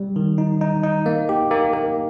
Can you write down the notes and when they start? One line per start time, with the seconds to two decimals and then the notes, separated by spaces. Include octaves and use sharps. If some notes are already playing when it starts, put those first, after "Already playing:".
Already playing: G3
0.16 D#3
0.38 D#4
0.61 D#4
0.84 D#4
1.06 A#3
1.29 G4
1.51 A#3
1.74 A#3